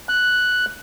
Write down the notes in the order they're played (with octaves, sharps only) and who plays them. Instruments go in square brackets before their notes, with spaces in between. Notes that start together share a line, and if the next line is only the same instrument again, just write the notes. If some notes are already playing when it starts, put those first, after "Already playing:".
[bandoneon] F#6